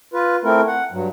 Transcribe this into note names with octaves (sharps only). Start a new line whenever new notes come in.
F4 B4
A3 C4 E4 A#4
F#5
G2 F#3